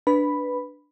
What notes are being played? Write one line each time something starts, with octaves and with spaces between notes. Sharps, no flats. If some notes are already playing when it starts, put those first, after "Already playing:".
D4 B4 B5